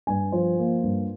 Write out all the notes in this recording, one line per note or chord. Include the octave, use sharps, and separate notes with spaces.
G2 G#5
F3 C5
A#3
G2